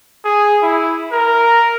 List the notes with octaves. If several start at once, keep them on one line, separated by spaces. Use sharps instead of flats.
G#4
E4
A#4